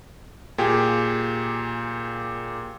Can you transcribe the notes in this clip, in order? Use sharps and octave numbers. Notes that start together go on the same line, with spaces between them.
A#2 G4 G#4